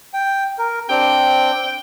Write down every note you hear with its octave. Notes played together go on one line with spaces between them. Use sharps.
G5
A#4
C4 D4 G5